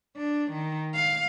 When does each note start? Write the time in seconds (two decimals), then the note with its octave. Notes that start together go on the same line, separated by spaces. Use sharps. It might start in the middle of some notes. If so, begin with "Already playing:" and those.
0.17 D4
0.52 D#3
0.95 F5